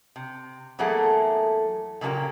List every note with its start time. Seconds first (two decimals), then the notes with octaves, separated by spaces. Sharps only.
0.16 C3
0.79 E2 F#3 A3 A#3 G#4 F#5
2.01 A#2 C#3 F#3 G#3 A#3 G4